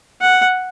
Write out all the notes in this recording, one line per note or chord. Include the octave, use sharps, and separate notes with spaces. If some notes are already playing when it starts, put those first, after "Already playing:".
F#5